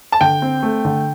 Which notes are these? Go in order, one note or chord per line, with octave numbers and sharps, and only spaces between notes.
A5
D3 G5
C4
A3
D3